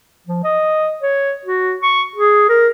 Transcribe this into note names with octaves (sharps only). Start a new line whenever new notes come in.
F3
D#5
C#5
F#4
C#6
G#4
A#4